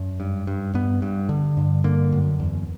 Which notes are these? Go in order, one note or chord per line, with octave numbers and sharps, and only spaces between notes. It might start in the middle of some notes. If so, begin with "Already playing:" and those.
Already playing: F#2
G2
G2
G2 B3
G2
D3
G2
D3 A#3
F#2
E2